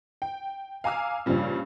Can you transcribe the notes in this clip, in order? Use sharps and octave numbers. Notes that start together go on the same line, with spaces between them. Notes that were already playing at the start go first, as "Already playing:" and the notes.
G5
F5 G#5 A#5 D6 E6 F6
G2 A#2 C#3 F3 G3 C#4